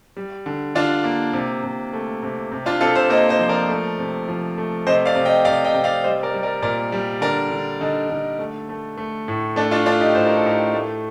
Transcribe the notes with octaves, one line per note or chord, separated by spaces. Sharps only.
G3
D3
D3 D4 F4
A#3
C3
C3
A3
C3
C3
D4 F4
C3 F4 A4
A4 C5
A#3 C5 D#5
C5 D#5
F3
A#4 D5
A3
C3
F3
A3
C3 C5 D#5
D5 F5
C3
D#5 G5
C3 D5 F5
D#5 G5
C3
D5 F5
G3 C5 D#5
A#4 D5
G3
A#4 D5
A#2 A#4 D5
G3
D3 A#4 D5
D3
D3 D#4
D3
A3
A3
A3
A2
A3 D4
D4 F4
A3 D4 F4
D#4 G4
A2 C5
A#4
A4
A2 G4 A#4
A3